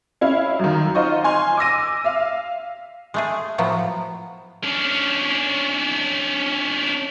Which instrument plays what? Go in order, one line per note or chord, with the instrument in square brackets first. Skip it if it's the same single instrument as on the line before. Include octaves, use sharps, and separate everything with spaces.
[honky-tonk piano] C#4 E4 F5
F#2 D#3
D#4 F4 C5 D#5 F#5 C#6
G#5 C6 F6
D6 E6 A#6 D#7
E5 F5
[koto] G#3 A3 G#4
A2 F3 F#3 B3
[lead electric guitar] C#4 D4